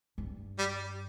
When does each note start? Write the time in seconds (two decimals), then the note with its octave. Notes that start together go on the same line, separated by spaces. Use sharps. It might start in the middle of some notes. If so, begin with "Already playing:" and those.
0.18 G2
0.58 G3